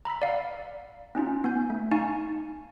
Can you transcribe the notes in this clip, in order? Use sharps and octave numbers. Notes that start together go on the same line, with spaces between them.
A#5 B5 E6 B6
D5 F5 F#5
C4 C#4 D#4 F4
B3 G#5 G6
A3
D#4 F5 G#5 A5 C#6